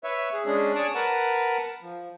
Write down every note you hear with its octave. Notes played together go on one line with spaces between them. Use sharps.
B4 C#5 E5
G#4
G#3 C#4 D4 G#4
C#5 D5 G#5 A5 D#6
A#4 B4 F#5 A5
F3